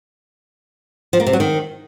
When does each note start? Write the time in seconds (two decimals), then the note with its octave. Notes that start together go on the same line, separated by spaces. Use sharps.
1.13 F3
1.20 A#3
1.27 C3
1.33 F#3
1.40 D#3